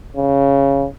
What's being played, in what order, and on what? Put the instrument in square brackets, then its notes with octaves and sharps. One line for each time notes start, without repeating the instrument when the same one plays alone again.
[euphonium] C#3